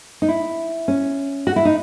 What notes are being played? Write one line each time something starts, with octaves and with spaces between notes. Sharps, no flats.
D#4
E4
C#4
F#4
E4
D#4